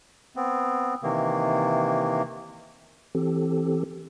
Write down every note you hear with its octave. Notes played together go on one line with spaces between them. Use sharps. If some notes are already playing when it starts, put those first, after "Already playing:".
B3 C4
C3 D#3 E3 A#3
E3 C4 G4 A4